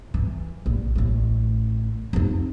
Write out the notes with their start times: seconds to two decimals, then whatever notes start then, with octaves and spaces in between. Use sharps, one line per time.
0.14 E3
0.66 A#1
0.95 A1 A3
2.13 F2 D#4